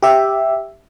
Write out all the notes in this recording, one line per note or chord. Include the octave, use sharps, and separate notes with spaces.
G4 E5